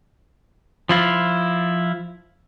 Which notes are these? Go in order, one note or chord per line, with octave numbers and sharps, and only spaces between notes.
F3 E4 F4